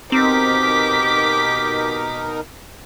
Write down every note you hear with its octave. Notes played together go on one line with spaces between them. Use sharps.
B2 C4 D#4 G4 A#4 D6 B6